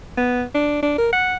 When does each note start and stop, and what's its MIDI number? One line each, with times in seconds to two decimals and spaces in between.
0.17 0.43 59
0.55 0.78 62
0.83 0.97 62
0.98 1.10 70
1.13 1.37 78